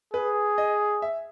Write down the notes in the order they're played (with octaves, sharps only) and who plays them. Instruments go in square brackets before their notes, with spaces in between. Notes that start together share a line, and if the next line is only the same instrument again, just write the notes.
[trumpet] G#4 [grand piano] B4
[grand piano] D#5
E5